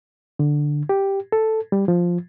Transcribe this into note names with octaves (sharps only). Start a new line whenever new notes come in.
D3
G4
A4
G3
F3